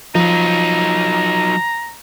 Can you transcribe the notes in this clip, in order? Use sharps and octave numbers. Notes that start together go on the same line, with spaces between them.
F3 F#3 D#4 A#5